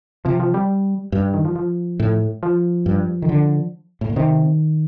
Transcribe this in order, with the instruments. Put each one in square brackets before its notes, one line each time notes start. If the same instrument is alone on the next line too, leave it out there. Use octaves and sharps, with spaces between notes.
[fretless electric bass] C3 [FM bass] F3
[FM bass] F3
G3
[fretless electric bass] G2
[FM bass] D#3
F3
F3
[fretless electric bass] A2
[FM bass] F3
[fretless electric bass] G2
D#3
D3
A2
A#2
[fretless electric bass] C3 [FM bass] D#3